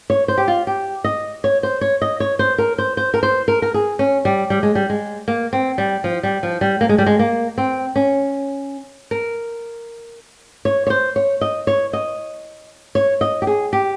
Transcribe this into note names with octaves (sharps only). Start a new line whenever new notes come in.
C#5
C5
G4
F4
G4
D#5
C#5
C5
C#5
D#5
C#5
C5
A#4
C5
C5
A#4
C5
A#4
A#4
G#4
C#4
G3
G3
G#3
G3
G#3
A#3
C4
G3
F3
G3
F3
G3
A#3
G#3
G3
G#3
A#3
C4
C#4
A#4
C#5
C#5
C5
C#5
D#5
C#5
D#5
C#5
D#5
G4
G#4
G4